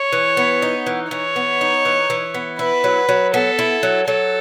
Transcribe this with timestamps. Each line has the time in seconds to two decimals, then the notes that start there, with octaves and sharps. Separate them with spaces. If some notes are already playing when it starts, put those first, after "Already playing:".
Already playing: C#5
0.13 E3
0.37 B3
0.62 D#4
0.86 E3
1.11 E3 C#5
1.36 B3
1.61 D#4
1.85 E3
2.10 E3
2.35 B3
2.59 E4 B4
2.84 F#3
3.09 F#3
3.34 B3 A4
3.59 E4
3.83 F#3
4.07 F#3 A4